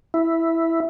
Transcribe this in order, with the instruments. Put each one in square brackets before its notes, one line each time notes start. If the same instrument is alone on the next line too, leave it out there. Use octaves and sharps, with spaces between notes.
[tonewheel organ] E4